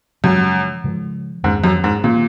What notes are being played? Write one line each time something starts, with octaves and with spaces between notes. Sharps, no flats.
F#2 C#3 F3 G#3
C#3 F3 G#3
F2 G#2 D#3 A#3 C#4
F#2
G#2
A#2 D#3 A#3 C#4